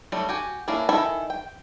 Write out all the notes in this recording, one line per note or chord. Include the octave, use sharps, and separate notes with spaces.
F#3 G3 A3
F#4 G4 G#5
A#3 C#4 D4 E4
D#3 E4 A4 G#5 B5
G5